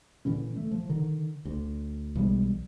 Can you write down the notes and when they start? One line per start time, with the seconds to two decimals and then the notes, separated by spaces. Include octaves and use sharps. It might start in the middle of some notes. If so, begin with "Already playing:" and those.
0.25 A#2 D3 E3 C#4
0.56 A3
0.71 F3
0.89 D3 D#3
1.45 D2
2.15 B1 E3 G3 G#3